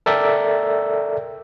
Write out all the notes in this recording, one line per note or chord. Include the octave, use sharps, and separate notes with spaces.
A4 A#4 D5 E5 G5